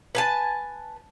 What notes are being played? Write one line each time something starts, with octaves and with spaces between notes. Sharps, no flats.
B4 G#5 A5